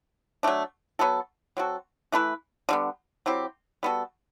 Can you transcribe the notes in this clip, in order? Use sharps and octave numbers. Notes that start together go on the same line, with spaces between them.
F#3 A3 D4
F#3 B3 F#4 A4
F#3 C4 F#4 A4
E3 A3 E4 B4
D3 G3 B3
F#3 C4 E4 G4
G3 B3 F#4 A4